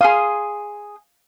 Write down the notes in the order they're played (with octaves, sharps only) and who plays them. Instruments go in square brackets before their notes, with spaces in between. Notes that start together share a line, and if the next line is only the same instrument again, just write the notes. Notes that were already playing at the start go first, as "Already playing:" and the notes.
[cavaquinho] G#4 C6 D#6 [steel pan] F5